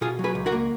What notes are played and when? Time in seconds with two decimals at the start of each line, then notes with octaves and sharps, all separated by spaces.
0.01 B2 F4 G#4
0.19 F#3
0.24 G#4 B4
0.35 C#2
0.46 F#4 A#4
0.52 A#3